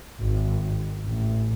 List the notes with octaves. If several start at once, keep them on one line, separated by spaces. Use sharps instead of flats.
G#1
A1